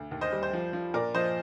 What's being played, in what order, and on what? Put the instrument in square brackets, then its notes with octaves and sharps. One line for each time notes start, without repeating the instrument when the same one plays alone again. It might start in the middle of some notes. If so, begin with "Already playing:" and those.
Already playing: [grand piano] D2
D#2
C5 D#5
G3
C5
F3
F3
A#2 A#4 D5
F3 C5 D#5